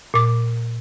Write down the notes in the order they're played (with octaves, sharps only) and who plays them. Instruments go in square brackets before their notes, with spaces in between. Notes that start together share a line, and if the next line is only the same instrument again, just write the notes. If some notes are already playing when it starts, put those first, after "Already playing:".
[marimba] A#2 D6